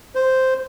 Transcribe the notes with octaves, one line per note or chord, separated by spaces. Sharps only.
C5